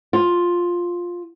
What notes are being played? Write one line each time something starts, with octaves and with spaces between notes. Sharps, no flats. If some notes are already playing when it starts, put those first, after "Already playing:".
F4